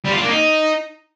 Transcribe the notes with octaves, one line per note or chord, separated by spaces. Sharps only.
G3
F4
D4
A#3
D#4